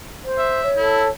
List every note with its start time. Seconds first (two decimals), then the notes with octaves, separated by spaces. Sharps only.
0.24 C5
0.38 E5
0.63 C#5
0.77 E4 A4